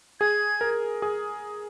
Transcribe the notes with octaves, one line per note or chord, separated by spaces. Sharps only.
G#4 G#6
A#4
G#4